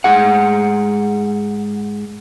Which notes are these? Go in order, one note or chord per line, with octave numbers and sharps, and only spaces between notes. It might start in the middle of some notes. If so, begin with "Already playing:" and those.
G#2 G#4 F#5